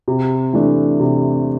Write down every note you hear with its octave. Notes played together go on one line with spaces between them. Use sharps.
C3
E3 A3 D4
C3